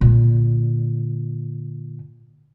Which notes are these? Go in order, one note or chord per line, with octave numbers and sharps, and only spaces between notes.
A#2 D3